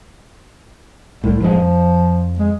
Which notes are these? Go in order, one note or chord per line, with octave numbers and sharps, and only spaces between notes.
C2 A2
A1 G2 F3 G#3
F2
G#3